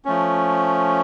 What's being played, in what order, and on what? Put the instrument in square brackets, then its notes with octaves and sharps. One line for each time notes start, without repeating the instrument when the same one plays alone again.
[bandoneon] F3 A3 C#4